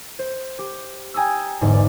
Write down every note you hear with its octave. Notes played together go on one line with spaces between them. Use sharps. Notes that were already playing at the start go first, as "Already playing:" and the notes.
C5
G4
G5 G#5 A#5 D#6 E6
G1 E2 G#2
D5